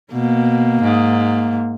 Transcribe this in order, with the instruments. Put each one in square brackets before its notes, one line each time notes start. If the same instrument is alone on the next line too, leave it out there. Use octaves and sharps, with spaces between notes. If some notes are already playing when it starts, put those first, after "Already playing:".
[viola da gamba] B2 [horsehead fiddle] A#3
[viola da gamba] G#2